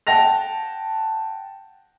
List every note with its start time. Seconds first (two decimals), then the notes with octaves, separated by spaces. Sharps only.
0.07 F#5 G5 A5 A#6 F7